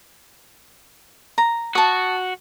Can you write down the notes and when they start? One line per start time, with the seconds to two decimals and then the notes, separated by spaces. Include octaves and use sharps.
1.38 A#5
1.75 F#4 A5 D#6